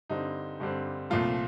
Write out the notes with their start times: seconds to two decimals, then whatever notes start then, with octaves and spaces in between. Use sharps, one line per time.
0.09 G2 D3 G3 C4 D#4
0.60 G2 D3 G3 C4
1.10 C2 A#2 F3 A3 F4